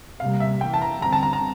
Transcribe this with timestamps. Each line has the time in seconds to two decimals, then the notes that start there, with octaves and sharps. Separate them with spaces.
0.20 C3 G3 A#3 F5
0.40 E5
0.61 E3 A#3 G5
0.74 A5
0.82 A#5
1.02 D3 G3 C4 A#5
1.13 A5
1.23 A#5
1.33 A#5